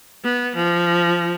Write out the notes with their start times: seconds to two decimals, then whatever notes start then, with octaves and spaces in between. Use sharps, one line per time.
0.24 B3
0.56 F3